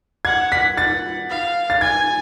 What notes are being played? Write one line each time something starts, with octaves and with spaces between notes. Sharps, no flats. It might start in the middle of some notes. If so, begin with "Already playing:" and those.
F#5 G#6
B6
F#5 A6
F5
A6
G#5 G#6